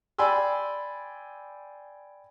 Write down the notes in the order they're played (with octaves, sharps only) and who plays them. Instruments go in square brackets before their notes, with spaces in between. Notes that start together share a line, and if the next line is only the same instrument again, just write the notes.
[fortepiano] D5 G5 G#5 B5 C6 E6